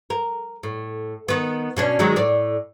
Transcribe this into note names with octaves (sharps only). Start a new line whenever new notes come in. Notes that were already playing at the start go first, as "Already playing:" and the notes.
A#4
A2
D#3 B3
B2 C#4 D4
D#3 F#3 G#3
A2 D5